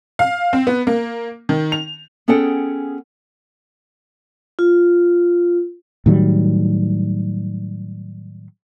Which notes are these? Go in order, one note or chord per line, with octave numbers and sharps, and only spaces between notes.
F5
C4
B3
A#3
D#3
F7
B3 C#4 G#4 A4 F#5 G5
F4
A2 D#3 F#3 G3